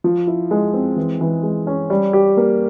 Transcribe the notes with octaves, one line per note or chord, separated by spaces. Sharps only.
F3
E4
G#3
C4
E3
E3
G#3
C#4
G3
G4
A#3